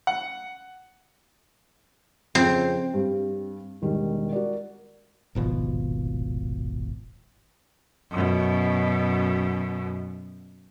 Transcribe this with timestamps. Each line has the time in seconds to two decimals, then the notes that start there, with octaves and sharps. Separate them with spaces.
0.07 F#5
2.35 F2 C#3 F3 C4
2.94 G2 G3
3.82 E1 D#3 G3
4.32 F#4 A#4 D5
5.35 D#1 G#1 B2 F3
8.10 F#2 B2